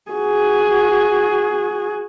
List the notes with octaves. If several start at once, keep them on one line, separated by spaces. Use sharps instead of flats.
F#4 G#4